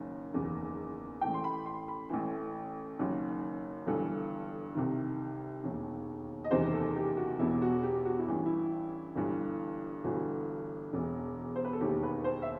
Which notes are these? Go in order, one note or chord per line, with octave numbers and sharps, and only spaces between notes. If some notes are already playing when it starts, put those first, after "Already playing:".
Already playing: F#1 F#2 D#3
F#1 E2 D#3
A1 A2 E3 G5
C6
B5
C6
B5
A1 A2 E3
F#1 F#2 D#3
G1 G2 E3 A4
C2 C3 D#3
E1 D#2 D#3
D#5
F#1 E2 C3 D#3 C5
A4
G4
F#4
E1 E2 B2 E4
F#4
G4
F#4
E4
A1 G2 E3
E4
G1 G2 E3
G1 G2 E3 F#4
E1 E2 B2
C5
B4
A4
E1 D#2 D#3 G4
B4
C5
E5